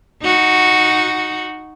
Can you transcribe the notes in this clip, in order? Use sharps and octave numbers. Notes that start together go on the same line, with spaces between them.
D#4 F#4